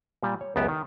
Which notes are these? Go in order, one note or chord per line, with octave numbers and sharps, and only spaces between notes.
A#2 G3
C#5
C#2 F#2 B3 G4 A5
D#3